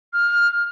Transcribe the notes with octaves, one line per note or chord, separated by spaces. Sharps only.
F6